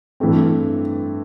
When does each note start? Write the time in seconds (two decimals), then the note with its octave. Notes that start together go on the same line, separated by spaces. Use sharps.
0.20 G2 E3 A3 C4